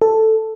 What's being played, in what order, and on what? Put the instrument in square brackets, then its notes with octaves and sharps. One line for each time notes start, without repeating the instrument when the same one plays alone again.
[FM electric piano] A4